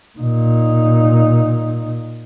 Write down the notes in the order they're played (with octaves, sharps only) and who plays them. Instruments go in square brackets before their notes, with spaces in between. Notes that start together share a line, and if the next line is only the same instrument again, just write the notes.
[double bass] A#2 D#4